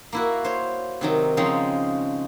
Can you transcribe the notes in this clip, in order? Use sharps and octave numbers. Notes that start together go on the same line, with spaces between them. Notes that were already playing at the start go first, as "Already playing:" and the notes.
A#3 E4 F#4
C5 C#5
C3 D#3 F#3
C#3 F3 G#3 C4 C#4 D#4